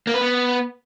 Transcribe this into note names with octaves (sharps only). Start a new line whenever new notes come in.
A#3
B4
B3